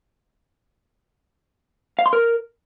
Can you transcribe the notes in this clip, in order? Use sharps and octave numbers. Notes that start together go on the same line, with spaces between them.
F5
C6
A#4